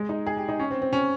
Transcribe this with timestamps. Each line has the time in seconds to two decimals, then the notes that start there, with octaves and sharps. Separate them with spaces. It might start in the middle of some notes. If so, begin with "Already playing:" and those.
Already playing: G#3
0.09 D#4
0.27 G#4
0.37 G4
0.49 D#4
0.59 C#4
0.71 C4
0.82 C4
0.93 C#4